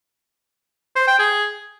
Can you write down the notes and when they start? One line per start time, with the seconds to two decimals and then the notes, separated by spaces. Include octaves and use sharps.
0.96 C5
1.07 G5
1.19 G#4